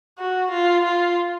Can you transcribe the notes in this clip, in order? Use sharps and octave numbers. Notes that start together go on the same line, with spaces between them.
F#4
F4
F4